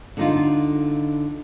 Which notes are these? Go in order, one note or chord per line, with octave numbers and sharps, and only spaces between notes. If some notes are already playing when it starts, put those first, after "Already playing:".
D3 D#4 F4